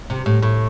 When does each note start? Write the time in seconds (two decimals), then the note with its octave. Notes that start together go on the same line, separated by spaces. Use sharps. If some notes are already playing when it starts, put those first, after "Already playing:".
0.10 C3
0.26 A2
0.43 A2